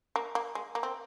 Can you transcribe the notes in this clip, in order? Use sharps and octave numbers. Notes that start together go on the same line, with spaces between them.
A#3
A#3
G#3
A#3
C4